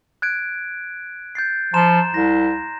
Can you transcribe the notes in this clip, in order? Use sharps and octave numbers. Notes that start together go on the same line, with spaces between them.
F#6 G#6 D7
G6 A6 C7
F3 A#5 C6 E7
C2 C6 A#6